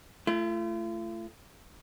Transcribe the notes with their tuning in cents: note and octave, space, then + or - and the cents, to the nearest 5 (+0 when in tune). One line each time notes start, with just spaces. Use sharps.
A3 +0 F4 -45